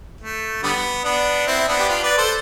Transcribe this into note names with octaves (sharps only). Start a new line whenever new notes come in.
A3
D3 G3 B3
B3 D4
C4 E4
B3 D4
G4
D4 F4
B4 D5
A4 C5